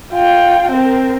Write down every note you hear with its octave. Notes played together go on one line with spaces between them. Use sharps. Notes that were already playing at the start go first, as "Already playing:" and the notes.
F4 G5
C4 A#4